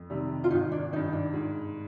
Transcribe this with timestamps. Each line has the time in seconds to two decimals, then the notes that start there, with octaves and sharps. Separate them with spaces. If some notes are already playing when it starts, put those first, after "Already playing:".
Already playing: F2
0.10 C3 D#3 G3
0.44 F4
0.51 G#1 D#4
0.72 D4
0.92 D#3 D#4
0.96 G2
1.13 D4
1.33 G#2